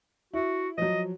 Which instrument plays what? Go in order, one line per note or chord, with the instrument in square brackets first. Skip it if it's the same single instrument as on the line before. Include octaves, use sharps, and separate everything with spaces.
[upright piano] E4 [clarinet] F#4
[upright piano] F3 F#3 [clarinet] D#5